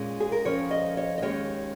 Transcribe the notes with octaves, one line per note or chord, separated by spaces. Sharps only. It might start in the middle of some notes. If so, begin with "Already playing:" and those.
Already playing: A#2 G#3 C#4
G#4
A#4
F2 F3 C#4 C#5
D#5
C#5
D#5
D#2 D#3 G#3 C#4 C#5